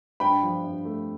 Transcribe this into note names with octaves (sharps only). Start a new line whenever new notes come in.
G2 G5 B5
F3
G2
A3